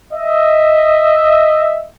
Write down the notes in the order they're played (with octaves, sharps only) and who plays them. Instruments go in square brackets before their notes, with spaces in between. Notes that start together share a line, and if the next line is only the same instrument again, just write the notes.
[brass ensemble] D#5 E5